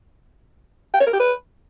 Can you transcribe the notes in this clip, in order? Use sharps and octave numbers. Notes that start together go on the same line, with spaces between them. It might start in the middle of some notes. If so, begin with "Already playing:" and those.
G5
C#5
A#4
G4
B4